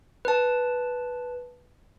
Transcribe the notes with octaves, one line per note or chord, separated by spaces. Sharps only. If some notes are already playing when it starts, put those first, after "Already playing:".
B4 A5